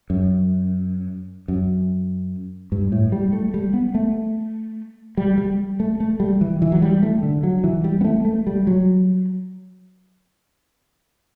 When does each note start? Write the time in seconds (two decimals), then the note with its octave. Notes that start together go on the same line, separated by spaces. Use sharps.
0.10 F#2
1.48 F#2
2.72 G2
2.92 A2
3.12 G3
3.33 A3
3.54 G3
3.74 B3
3.95 A3
5.17 G3
5.38 G3
5.80 A3
6.00 A3
6.20 G3
6.41 E3
6.62 E3
6.72 F#3
6.82 G3
7.03 A3
7.23 D3
7.43 F#3
7.64 E3
7.84 G3
8.01 B3
8.04 A3
8.25 A3
8.47 G3
8.67 F#3